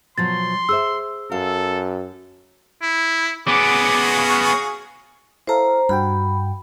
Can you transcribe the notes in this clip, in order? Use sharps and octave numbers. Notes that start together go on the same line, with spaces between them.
B2 F3 F#3 C6 A6
G#4 C5 E5 E6
F#2 A4 F5
E4
B3 C#4 F#4 G#4 D6
F5 C#6
E4 A4 C5 F5 A#5
G2 F#4 G5 B5